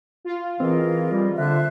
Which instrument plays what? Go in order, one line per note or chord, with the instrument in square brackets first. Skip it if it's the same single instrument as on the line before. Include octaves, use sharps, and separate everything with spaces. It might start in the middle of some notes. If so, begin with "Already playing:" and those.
[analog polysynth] F4
[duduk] E3 [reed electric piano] C4 [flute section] G#4 A#4 D#5
[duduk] G3
[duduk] D3 [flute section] C5 E5 F#6